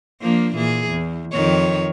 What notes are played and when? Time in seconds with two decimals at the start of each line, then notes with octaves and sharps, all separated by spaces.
0.21 F3 A#3 D4
0.55 A#2 E3 G#4
0.91 E2
1.32 F2 D#3 C#5